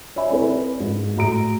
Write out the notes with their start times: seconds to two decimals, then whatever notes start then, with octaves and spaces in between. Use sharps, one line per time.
0.16 C#5 D5 E5 G#5 B5
0.30 C4 E4 A#4 B4
0.80 G#2
1.16 A2 F#4 A#5 D7